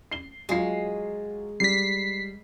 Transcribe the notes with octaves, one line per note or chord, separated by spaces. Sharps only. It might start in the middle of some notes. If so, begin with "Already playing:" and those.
C7 G7
F#3 G#3 F4 C7
G3 B6 C7